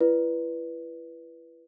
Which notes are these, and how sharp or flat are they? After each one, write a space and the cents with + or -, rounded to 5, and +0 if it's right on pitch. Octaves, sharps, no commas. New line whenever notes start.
E4 +40 B4 -15 D5 +0